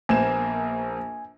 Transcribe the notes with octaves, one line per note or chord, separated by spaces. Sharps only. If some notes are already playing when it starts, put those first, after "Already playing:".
A#1 A#3 B3 C5 G#5 E7